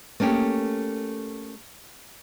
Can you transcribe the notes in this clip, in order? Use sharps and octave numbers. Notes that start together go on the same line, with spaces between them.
A3 A#3 C#4 G4